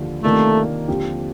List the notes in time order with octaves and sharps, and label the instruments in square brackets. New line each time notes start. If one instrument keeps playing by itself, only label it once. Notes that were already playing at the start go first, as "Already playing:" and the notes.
Already playing: [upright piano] D#2 D3 F3
[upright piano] C3 D#3 A#3 D4 F4 [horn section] A3
[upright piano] D#2 D3 F3 C4 G4